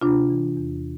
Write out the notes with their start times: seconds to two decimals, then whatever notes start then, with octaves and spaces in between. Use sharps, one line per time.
0.02 C3 D4 F4
0.30 E3
0.57 E2